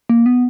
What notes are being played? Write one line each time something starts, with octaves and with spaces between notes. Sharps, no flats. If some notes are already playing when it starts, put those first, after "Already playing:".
A#3
B3